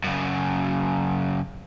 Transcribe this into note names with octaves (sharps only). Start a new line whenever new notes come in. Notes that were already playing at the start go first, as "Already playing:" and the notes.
F#2 C#3